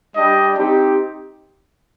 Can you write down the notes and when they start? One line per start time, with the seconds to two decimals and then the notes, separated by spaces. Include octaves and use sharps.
0.16 G3 D4 G4 D#5
0.57 C4 D#4 G4